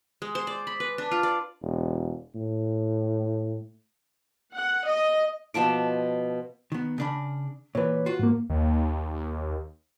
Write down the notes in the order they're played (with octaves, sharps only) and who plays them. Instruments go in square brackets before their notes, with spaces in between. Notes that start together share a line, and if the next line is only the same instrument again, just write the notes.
[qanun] G#3
C5
D5
B5
B4
D4
F4
D5
[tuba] E1
A2
[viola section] F#5
D#5
[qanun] B2 F3 A5 D6
[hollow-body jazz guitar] D#3 B3
C#3 D4 B5
[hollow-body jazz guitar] A#2 E3 [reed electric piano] B4 C#5
[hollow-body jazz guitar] F4 F#4
[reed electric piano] G#2 A#3
[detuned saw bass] D#2